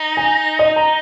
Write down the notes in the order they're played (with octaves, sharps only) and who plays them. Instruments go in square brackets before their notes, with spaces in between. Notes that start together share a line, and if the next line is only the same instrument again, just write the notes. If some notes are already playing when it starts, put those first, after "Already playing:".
Already playing: [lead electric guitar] D#4
[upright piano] G#5
D#5
A#5